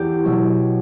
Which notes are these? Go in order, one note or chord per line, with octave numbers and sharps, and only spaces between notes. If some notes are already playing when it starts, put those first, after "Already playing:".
Already playing: E2 G4
B2 F#3